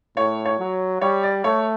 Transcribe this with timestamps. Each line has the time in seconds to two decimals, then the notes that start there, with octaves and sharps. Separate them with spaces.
0.17 A2 C#5
0.45 C#5
0.59 F#3
1.01 G3 C#5
1.23 D5
1.44 A3 C#5